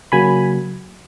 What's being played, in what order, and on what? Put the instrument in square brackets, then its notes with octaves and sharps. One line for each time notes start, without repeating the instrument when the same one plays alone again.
[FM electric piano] C#3 F#3 A#3 G#5 B5